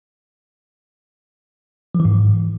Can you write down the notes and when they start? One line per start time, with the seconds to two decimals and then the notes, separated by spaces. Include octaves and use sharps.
1.95 F3
2.00 E3
2.05 G#2